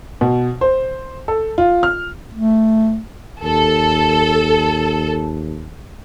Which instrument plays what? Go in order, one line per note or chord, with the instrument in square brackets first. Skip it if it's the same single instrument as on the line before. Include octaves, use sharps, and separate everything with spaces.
[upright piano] B2
C5
A4
F4
F6
[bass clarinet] A3
[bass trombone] D#2 [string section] A4